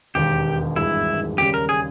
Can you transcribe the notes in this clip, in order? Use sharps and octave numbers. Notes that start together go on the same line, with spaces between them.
E1 D#2 D#3 G4
G#1 G2 E3 G#3 E4
D#2 C#3 G3 G4
A#4
G#4